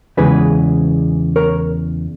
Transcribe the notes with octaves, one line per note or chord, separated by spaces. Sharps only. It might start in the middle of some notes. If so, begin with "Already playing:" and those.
E2 C#3 E3 G#3 G#4 B4
A#4 C#5